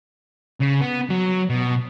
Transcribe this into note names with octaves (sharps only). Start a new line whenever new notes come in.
C#3
B3
F#3
B2